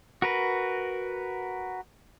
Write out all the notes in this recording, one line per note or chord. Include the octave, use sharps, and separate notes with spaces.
F#4 A#4 B4